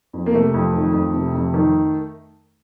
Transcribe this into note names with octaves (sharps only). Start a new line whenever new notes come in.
F2
A#3
C3 A3
F2
D#3
F2
C3
F2
D#3